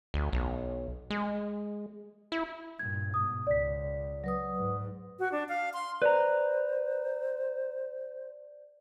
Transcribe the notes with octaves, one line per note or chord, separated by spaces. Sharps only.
D2
B1
G#3
E4
G2 A#2 G#6
G#2 B2 D#6
C#2 D5 B6
F#3 B4 D#6
G#2
F#4
D4
F5
C6
B4 C5 D5 A#5